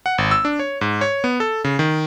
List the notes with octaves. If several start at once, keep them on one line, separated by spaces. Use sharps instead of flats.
F#5
G#1
E6
D4
C#5
G#2
C#5
B3
A4
C#3
D#3